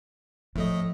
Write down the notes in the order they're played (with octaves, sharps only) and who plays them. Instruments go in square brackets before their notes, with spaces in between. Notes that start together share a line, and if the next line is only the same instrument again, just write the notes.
[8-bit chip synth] A2 A3 D#5 [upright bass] F3